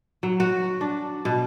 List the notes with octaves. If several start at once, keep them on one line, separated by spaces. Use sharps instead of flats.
F#3
F#4
D4
B2